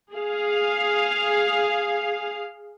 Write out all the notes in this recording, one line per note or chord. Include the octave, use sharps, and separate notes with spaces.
G#4 F5